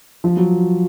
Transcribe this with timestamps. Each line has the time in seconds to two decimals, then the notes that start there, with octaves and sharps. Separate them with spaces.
0.24 F3
0.37 F#3